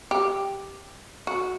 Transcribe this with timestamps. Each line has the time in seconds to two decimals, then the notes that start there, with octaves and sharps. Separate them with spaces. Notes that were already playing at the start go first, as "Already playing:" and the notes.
0.11 G4
1.27 F#4